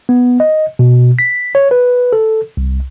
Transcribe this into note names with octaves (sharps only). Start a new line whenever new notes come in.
B3
D#5
B2
B6
C#5
B4
A4
C2